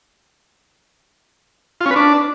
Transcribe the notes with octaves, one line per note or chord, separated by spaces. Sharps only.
F4
C#4
B4
D4